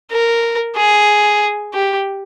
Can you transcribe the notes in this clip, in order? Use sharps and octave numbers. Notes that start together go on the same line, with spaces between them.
A#4
G#4
G4